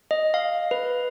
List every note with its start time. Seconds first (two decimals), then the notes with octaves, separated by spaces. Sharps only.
0.11 D#5
0.34 F5
0.71 B4